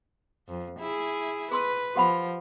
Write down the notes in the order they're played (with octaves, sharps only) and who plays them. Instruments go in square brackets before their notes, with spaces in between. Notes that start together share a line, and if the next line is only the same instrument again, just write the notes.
[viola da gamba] F2
E4 G#4
[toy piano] G#4 C6 E6 [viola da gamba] B4
[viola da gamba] F3 [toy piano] G4 F#5 B5